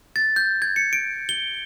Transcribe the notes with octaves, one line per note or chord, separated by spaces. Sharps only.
A6
G6
G#6
C#7
D7
G7